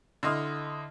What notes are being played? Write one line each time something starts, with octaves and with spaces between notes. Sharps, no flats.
D3 E4 D#5 C6 D#6 F6